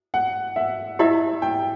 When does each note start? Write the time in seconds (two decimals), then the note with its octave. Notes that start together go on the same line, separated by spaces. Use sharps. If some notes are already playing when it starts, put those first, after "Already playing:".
0.14 F#5
0.56 E5
0.99 E4 G4 D#5 E5
1.42 G5